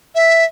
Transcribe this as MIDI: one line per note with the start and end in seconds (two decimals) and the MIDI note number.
0.15 0.44 76